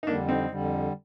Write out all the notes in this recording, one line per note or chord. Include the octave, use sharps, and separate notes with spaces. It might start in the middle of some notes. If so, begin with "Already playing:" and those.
D#4
F2 D3 G3 A#3 D4
C4 D#4
F2 D3 G3